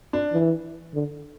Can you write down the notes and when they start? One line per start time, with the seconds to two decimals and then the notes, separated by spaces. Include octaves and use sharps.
0.13 D4
0.33 E3
0.94 D3